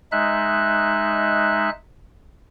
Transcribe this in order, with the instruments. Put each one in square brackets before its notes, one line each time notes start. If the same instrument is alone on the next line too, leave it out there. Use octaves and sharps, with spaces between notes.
[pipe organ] G#3 D#4 E5 F#6